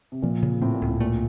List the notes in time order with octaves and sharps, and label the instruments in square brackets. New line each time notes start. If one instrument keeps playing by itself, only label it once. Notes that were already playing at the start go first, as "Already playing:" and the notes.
[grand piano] C3
[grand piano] A#2 [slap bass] F3
[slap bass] C#3
[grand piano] A2 [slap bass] C4
[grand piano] A#2
[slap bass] C#2
[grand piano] A2
[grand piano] A#2 [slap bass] A3